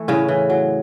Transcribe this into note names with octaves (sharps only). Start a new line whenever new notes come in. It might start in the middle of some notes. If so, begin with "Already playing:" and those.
Already playing: E3 A3
A2 C#3 C#4
E3
F#3